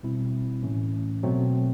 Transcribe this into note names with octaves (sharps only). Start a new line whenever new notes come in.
B2 G3 C4 E4
A2 E3 A3 C#4
B2 F#3 A3 C4